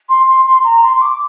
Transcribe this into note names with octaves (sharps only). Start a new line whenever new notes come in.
C6
C6
C6
A#5
C6
C6
D6